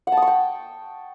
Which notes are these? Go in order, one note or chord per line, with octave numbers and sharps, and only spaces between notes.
F#5
A5
D#6
C#6
G5